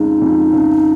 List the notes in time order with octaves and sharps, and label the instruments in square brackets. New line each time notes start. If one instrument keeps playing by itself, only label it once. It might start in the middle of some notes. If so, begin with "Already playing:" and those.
Already playing: [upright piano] F2 C#3 G#3 [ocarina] D#4
[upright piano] F2
C#3